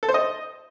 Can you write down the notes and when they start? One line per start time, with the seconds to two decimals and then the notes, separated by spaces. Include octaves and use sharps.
0.03 A4
0.08 C5
0.14 D#5